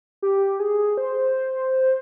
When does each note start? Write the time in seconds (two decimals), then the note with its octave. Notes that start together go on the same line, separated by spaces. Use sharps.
0.22 G4
0.60 G#4
0.98 C5